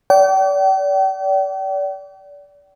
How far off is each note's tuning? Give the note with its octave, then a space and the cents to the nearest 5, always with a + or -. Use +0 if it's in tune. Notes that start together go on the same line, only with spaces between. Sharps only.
D5 -35 G5 -40